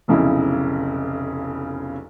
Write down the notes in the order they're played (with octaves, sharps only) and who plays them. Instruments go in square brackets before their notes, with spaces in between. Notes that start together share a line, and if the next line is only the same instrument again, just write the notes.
[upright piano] F1 B1 C#3 E4